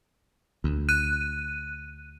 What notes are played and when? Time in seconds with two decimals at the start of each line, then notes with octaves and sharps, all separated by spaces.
0.64 D2
0.89 F#6 D#7